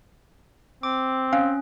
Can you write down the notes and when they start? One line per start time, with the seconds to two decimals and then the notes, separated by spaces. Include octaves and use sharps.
0.83 C4 D6
1.33 C#4 F5